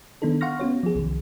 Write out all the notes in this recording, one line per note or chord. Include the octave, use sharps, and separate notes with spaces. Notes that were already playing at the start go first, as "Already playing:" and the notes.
D#3 B3 D4 D#4 A4
F5 F#5 C6 C#6 F6 A#6
B3 C#4 F#4 C#5
F3 G#4
C2 D#3